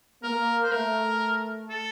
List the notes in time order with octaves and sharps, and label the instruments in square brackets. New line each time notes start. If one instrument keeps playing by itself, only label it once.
[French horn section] A#3 [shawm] A#4
[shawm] C5
[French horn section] A3 [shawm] A#4
[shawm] A4